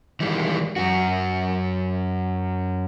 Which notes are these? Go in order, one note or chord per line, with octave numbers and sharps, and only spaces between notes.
D#3 E3 G3 G#3
F#2 F#4